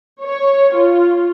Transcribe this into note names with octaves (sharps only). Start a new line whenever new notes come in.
C#5
F4